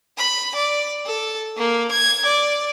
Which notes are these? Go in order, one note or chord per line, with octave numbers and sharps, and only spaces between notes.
B5
D5
A4
A#3
G#6
D5